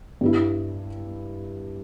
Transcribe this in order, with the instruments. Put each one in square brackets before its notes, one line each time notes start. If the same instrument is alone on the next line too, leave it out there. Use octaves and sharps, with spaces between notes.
[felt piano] G2 G3 E4